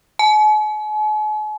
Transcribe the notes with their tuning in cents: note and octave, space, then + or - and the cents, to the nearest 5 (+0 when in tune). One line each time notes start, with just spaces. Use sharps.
G#5 +45